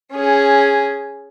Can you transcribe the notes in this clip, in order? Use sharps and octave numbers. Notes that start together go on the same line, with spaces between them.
C#4 G#4